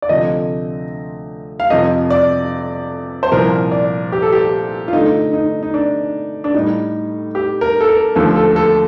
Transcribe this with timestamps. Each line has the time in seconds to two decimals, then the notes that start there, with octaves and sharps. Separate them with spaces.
0.02 D5
0.09 D2 C3 F3 A3 D#5
1.60 F5
1.70 F2 C3 F3 D#5
2.10 D5
3.23 C5
3.32 C2 A#2 F3 A#4
3.72 D5
4.12 G4
4.22 A4
4.32 G4
4.88 F4
4.93 G2 D3 A3 D#4
5.33 D#4
5.63 D#4
5.74 D4
6.44 D4
6.54 A2 G3 D#4
7.35 G4
7.61 A#4
7.81 A4
7.88 A#4
8.15 D#2 D3 F3 A3 A4
8.36 A4
8.56 A4